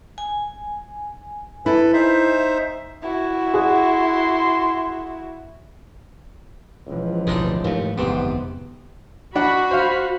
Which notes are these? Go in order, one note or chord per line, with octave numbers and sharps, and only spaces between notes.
G#5
E4 A4 B4
D#4 C5 E5
E4 F#4
G#4 F#5 C6
C#2 E3 F3
D1 A1 B2 G#3 D4 D#4
D#2 G#2 A3
G1 F2 G#2 C3 B3 C4
D4 F#4 F#5 B5
C5 F5